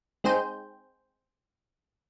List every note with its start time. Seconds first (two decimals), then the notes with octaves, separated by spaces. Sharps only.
0.24 G#3 C4 D#4 G#4 C5 G5